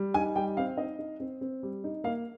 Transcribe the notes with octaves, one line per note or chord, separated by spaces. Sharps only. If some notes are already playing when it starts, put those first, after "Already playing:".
Already playing: G3
D#4 G#5
G3 G5
C4 F5
D#4 D#5
D#4
C4
C4
G3
D#4
A#3 F5